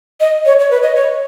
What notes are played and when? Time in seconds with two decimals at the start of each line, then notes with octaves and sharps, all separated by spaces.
0.20 D#5
0.46 C#5
0.59 C#5
0.71 B4
0.83 D#5
0.95 C#5